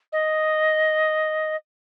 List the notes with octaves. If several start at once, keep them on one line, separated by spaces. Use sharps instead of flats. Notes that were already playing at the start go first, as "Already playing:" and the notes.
D#5